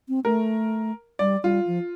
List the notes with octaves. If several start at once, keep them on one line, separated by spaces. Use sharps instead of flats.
C4
A3 A#4
G3 D5
G3 F4
F3